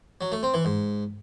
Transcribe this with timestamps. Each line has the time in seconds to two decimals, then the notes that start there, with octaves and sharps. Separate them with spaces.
0.21 F#3
0.32 A3
0.43 C4
0.54 E3
0.65 G#2